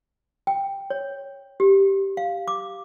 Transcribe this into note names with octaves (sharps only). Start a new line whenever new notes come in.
G5
C#5
G4
F5
D6